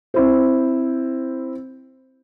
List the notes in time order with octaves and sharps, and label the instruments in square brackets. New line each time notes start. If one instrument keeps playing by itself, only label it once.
[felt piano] C4 E4 C5